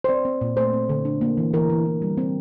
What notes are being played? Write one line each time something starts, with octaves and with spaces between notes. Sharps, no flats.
C5
C4 D5
C4
A#2
A3 C5
C4
D3
D4
A#3
E3
E3 A#4
E3
E3
G3
C4